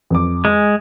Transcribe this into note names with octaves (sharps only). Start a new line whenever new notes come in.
F2 D6
G#3 G#5